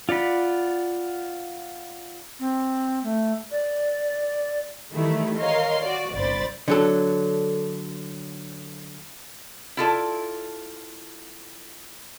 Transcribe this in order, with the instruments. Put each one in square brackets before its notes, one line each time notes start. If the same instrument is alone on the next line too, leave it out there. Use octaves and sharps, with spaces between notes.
[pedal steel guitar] F4 D5 F#5 B5
[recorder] C4
A3
D5
[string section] D#3 E3 G3 A3 E4
A#4 C#5 D#5 F5 C6
F#4 D5
G1 C2 C5 D5 B5 A6
[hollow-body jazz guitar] D3 F#3 A4
[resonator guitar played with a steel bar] E4 F4 A4 D5